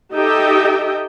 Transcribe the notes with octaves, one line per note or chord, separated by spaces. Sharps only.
D#4 G4 A4 D#5 E5 G5